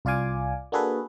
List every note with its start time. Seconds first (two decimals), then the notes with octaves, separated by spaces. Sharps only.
0.05 C2 F4 D5 F5 G#5 D6
0.72 A#3 D4 F#4 G#4 A4 B4